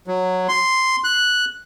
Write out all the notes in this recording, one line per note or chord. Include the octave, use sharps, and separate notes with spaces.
F#3
C6
F#6